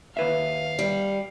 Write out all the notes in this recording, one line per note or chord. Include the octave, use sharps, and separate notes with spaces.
D#2 B4 E5 F5
G3